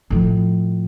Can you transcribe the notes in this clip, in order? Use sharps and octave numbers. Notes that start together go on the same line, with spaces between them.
A2 F3